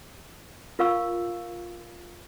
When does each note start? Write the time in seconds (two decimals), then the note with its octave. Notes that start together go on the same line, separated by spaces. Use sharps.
0.79 F4 A#4 F5 C#6 E6